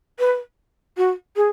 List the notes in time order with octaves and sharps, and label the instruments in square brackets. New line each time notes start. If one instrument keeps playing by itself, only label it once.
[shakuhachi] B4
F#4
G#4